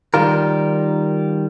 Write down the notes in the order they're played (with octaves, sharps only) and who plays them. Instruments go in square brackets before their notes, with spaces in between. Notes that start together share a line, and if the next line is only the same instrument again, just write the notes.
[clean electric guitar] D#3 G3 F4 A#4